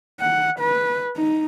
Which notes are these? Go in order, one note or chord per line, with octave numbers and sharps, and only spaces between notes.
F#5
B4
D#4